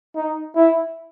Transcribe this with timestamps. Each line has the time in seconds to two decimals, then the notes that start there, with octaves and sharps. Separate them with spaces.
0.15 D#4
0.55 E4